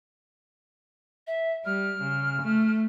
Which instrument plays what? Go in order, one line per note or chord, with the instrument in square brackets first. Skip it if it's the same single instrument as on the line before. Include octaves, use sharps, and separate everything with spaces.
[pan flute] E5
[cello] G3 [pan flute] F6
[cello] C#3
A3